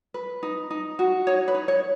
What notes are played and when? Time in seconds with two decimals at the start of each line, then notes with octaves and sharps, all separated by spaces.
0.14 B4
0.43 D#4
0.70 D#4
0.99 F#4
1.27 D#4 C#5
1.48 B4
1.55 D#4
1.68 C#5